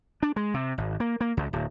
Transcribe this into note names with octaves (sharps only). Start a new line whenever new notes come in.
D4
G#3
C3
G#1
A#3
A#3
C#2
D1